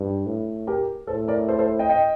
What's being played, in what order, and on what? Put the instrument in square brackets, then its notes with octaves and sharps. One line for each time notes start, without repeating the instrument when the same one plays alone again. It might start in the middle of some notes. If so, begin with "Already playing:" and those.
Already playing: [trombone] G2
A2
[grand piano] G4 A#4
[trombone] A2 [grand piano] A4 C5
[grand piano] A#4 D5
A4 C5
A4 C5
D#5 G5
D#5 G5